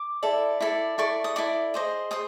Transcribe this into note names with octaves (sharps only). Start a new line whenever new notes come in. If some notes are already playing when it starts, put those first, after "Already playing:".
Already playing: D6
E4 A4 D5
E4 A4 D5
E4 A4 D5 C#6
D#6
E4 A4 D5 D6
G#4 C5 D#5
G#4 C5 D#6